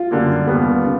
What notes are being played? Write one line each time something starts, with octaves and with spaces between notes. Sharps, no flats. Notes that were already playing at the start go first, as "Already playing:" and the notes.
Already playing: F4
F#2 D3 G3 A#3
D#2 D3 G3 B3
C#3